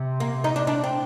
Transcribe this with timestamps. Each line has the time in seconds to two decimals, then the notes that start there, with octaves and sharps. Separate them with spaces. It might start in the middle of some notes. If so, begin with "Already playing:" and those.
Already playing: C3
0.20 A#3
0.44 D#4
0.56 D4
0.67 D4
0.84 C4